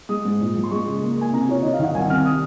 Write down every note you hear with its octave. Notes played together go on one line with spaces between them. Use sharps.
G#3 D#6
G#2
A#2
F3
C6
G#3 C#6
C#3
A#3
A#3 G#5
C3 A#5
F4 C#5
D#3 D#5
F5
D#3 F#5
C2 G#5
C3 F6
D#6